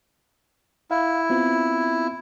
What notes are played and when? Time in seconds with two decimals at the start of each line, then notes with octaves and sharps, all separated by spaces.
0.91 E4 F5
1.30 B3 C4 F4